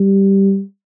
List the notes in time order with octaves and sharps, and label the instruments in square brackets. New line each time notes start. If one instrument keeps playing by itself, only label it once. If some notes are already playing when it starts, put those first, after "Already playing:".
Already playing: [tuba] G3